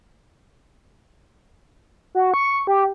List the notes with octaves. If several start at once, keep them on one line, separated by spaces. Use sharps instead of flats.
F#4
C#6
G4